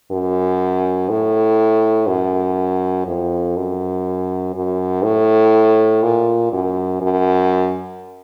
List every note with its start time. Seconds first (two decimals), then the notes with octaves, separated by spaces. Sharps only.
0.11 F#2
1.09 A2
2.08 F#2
3.07 F2
3.56 F#2
4.55 F#2
5.04 A2
6.03 A#2
6.53 F#2
7.02 F#2